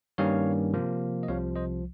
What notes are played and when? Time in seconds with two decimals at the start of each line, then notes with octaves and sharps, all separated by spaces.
0.18 G2 D#3 G3 A#3 C#4 C#5 F5
0.74 C3 F3 A#3
1.23 D#5
1.28 C2 C3 F3 C#5 F5
1.56 C5 D#5